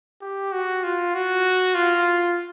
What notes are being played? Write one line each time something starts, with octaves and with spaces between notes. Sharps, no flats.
G4
F#4
F4
F#4
F4